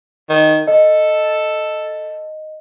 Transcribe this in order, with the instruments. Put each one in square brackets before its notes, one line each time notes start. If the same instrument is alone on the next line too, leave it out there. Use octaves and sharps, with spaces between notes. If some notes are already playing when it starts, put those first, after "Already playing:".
[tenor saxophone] D#3
[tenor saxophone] A4 [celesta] D#5